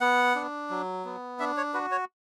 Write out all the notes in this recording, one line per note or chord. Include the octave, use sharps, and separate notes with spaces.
B3 F#5
D4
F#3
B3
D4 E5
C#5
F#4 B4
C#5